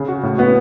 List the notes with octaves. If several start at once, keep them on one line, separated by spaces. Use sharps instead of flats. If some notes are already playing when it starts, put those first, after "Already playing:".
Already playing: C#3
F#4
A2
B3 F#4